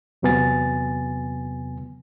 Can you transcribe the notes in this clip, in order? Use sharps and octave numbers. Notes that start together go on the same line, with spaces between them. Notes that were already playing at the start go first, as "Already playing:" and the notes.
E2 C3 F#3 B3 G#5 A6